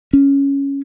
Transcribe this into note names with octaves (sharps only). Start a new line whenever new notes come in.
C#4